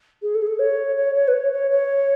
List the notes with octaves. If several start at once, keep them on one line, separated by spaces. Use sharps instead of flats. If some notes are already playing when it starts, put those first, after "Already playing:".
G#4
A4
G#4
A4
C#5
C#5
C#5
B4
C#5
C#5
C#5